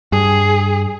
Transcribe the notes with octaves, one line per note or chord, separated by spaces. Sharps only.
G2 G#4